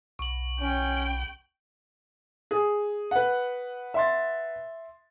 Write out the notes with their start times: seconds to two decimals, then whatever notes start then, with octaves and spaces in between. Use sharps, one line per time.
0.19 B1 C#6 F#7
0.60 C#4 G5
2.51 G#4
3.11 B4 F#5
3.94 E5 C6 A6